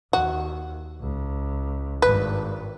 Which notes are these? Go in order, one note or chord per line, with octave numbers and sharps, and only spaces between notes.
D#2 F#4
C#2
G#1 G2 B4